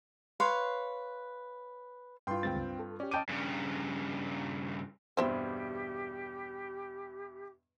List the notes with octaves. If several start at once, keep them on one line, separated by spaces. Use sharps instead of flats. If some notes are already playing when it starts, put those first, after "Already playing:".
B4 C#5 F5 C6
G2 F4 G5 C6
D2 G#3 C4 G5 A6
C#2
A4
C#4 G4 D5
D#5 G5 A5 D6 D7 D#7
G2 C#3
E2 G2 B2 C4 G4 C5 E5